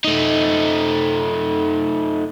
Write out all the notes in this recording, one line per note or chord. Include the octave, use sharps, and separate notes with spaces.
A3 D#4